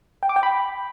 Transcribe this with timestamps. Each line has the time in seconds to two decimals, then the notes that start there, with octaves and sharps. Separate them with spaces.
0.23 G5
0.29 D6
0.36 G5
0.43 B5